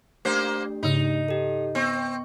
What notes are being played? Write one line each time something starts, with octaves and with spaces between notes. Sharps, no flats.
A3 A#3 D4 G4 C5
G#2 C#3 D#4
G4 A4
B3 C4 C#6